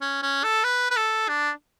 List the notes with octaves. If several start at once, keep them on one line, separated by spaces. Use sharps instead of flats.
C#4
C#4
A4
B4
B4
A4
D4